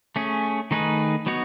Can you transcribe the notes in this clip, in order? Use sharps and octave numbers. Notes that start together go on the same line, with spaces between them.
A3 C#4 G#4
D#3 A3 D#4 G#4 B4
F#3 B3 D#4 F#4 C#5